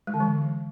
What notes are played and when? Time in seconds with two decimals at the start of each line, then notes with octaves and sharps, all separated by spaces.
0.07 G#3
0.14 D3
0.20 E3